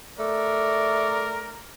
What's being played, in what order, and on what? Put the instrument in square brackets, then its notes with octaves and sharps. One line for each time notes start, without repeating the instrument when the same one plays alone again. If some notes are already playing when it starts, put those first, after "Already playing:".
[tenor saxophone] A3 [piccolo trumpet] A#4 [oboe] D5